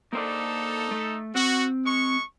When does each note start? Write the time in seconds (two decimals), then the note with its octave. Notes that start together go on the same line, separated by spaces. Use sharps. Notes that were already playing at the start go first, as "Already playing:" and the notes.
0.13 A#3 D#4 A4 C5 D5
0.91 A3
1.35 C4 F#4
1.85 G#3 C#6